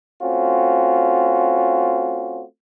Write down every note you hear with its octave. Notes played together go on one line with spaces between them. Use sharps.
A3 C4 C#4 F4 F#4